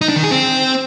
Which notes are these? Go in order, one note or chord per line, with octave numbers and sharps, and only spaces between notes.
D#4
D4
D#3
G#4
C4